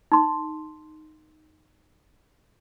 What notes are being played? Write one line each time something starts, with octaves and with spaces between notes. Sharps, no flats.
D#4 C6